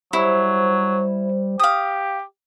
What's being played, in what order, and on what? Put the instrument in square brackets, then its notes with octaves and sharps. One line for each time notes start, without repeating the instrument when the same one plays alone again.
[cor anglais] F#3 [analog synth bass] G3 [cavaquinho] E4 [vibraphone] C5
[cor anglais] G4 [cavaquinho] F5 D#6